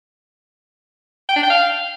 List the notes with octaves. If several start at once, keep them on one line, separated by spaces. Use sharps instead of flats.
G5
D4
G5
F5